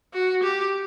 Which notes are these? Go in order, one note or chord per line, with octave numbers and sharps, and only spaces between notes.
F#4
G4